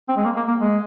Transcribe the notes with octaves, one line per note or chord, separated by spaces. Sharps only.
C4
G#3
A#3
A#3
A#3
G#3